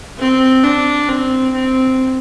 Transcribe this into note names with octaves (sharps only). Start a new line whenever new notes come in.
C4
D4
C4
C4